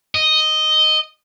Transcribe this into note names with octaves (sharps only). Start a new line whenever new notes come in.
D#5